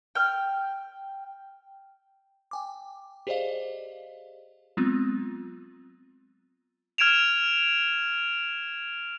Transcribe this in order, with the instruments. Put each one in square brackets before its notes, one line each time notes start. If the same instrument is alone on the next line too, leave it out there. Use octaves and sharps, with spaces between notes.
[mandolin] G5 F6
[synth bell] G5 G#5 D6
G4 G#4 C5 D5 D#5 F5
F#3 G#3 B3 C4 F4
[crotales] F6 G#6 D7 E7 F7